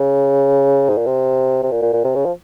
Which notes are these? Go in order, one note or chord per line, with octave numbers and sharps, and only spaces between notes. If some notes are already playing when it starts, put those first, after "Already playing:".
Already playing: C#3
G#2
A#2
C3
C3
A#2
A#2
A#2
C3
C#3
F3